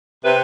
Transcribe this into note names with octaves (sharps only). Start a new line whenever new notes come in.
C3 B4